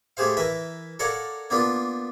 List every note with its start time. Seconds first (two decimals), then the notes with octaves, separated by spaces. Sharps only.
0.17 A3 G4 G#4 C5 F5
0.37 E3 A#4 B4 E5
0.99 A4 A#4 C#5 D5 F5 F#5
1.50 A#3 B3 D4 F4